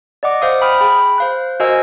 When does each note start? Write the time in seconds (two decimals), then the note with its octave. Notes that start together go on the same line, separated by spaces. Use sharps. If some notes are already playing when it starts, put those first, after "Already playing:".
0.23 D5 D#5 F#5 D6
0.41 C5 F5 D#6
0.61 G5 B5 D#6 F6
0.81 G#4 G5 B5
1.18 C5 F5 F#6
1.60 F#4 A#4 C5 D#5 G#5 E6